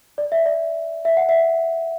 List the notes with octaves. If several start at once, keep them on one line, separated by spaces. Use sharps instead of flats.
D5
E5
D5
E5
F#5
E5